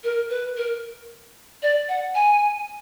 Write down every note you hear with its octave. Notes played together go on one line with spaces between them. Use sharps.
A#4
B4
A#4
D5
F#5
G#5